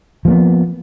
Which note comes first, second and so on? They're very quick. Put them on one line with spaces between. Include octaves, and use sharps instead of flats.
F3 A#3 B3